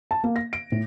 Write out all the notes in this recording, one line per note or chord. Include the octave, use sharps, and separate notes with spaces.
A5
A#3
A#6
D7
A2